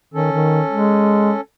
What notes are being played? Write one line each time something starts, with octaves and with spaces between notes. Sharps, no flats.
D#3 C#4 A4
D#3
G#3